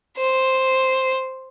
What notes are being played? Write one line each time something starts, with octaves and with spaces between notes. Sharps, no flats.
C5